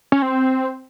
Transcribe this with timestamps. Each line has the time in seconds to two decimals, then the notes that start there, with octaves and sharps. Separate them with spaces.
0.12 C#4
0.22 C4